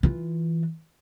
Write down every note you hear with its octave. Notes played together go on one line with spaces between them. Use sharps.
E3 F4